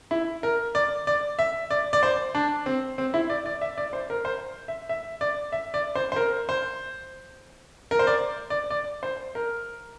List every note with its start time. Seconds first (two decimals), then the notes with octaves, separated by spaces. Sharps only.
0.11 E4
0.43 A#4
0.75 D5
1.07 D5
1.39 E5
1.71 D5
1.93 D5
2.03 C5
2.35 D4
2.66 C4
2.98 C4
3.14 E4
3.30 D5
3.46 D5
3.61 E5
3.78 D5
3.93 C5
4.10 A#4
4.25 C5
4.68 E5
4.89 E5
5.21 D5
5.52 E5
5.74 D5
5.95 C5
6.12 C5
6.16 A#4
6.49 C5
7.91 A#4
7.99 C5
8.07 D5
8.50 D5
8.70 D5
9.03 C5
9.35 A#4